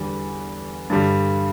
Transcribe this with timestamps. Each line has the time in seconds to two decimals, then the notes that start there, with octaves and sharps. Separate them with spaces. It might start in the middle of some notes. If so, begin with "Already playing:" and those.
Already playing: E2 D3 G3
0.90 G2 D3 G3